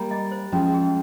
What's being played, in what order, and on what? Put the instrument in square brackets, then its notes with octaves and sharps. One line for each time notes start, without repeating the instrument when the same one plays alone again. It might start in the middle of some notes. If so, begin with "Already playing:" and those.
Already playing: [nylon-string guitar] G3 A#3 [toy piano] A#5
[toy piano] D#5
C5
[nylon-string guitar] F3 G#3 [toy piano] C#4
[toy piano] G#4